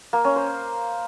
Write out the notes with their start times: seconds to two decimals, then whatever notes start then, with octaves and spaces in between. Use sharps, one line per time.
0.13 A#3
0.25 C#4
0.36 C5